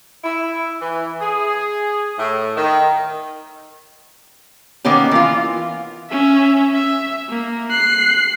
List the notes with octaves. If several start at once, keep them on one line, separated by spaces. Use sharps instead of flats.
E4
E3
G#4
A2
D#3
D#3 A#3 B3 C#4 G4
E3 A#3 F4
C#4 E5
E5
A#3
F#6 C7